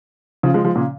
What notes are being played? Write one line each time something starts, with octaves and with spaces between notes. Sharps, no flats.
C#3 F3
F3 G#3
F3 G#3
A#2 C#3